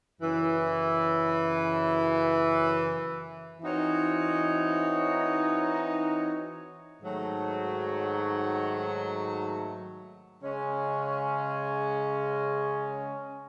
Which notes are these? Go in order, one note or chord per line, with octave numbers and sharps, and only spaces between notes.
F#2 C#3 E3
E3 C4 D#4 F#4 C#5
G#2 D#3 F#3 A3
C#3 G#3 C#4